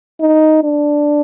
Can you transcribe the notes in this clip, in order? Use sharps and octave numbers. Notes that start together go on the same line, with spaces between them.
D#4
D4